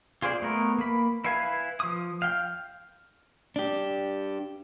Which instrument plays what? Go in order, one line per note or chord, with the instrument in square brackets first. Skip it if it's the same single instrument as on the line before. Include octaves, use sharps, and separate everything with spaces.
[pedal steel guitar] F4 G#4 C5 D5
A3 B3 A#4
A#3 B5
E4 B4 F5 G#5
F3 D#6
F5 G5 F6
[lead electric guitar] D4 G4